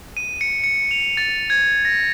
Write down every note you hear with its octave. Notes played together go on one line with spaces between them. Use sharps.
D#7
C#7
C#7
F7
A6
G#6
A#6